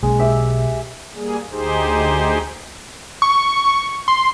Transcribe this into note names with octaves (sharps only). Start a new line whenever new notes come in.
B1 G#3 A#3 C#4
G4 E5
G3 A#3 G#4
D2 D#4 G4 G#4 C5
C#6
C6